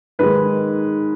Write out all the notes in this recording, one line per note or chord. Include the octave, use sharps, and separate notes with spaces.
G#2 D#3 G#3 B4